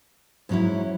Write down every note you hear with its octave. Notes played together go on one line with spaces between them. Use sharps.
G#2 F#3 C#4 E4